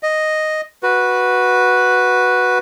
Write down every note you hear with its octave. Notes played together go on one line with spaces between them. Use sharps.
D#5
F#4 B4